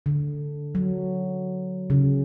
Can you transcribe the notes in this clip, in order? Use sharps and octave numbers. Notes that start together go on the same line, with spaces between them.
D3
F#3
C#3